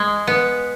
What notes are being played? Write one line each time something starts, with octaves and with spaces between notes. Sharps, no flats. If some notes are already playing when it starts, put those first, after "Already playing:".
Already playing: G#3
B3